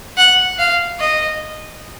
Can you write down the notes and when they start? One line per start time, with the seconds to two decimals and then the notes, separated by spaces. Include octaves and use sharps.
0.17 F#5
0.59 F5
0.99 D#5